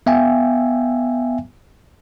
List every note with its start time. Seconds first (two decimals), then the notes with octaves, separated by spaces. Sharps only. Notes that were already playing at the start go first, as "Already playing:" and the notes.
0.06 B3 E5 F5 G5 G#5